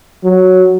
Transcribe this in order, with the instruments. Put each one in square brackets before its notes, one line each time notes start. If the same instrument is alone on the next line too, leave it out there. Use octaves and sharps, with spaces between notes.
[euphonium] F#3